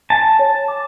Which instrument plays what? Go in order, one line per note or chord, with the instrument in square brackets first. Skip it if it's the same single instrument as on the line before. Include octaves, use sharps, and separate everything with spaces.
[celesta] G#5 [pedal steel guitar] A5
[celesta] C#5
D6